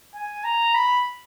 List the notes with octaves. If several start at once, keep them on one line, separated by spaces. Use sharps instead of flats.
G#5
A#5
B5